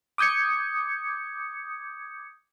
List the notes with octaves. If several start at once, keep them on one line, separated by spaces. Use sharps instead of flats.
D6 D#6 G6 G#6 C#7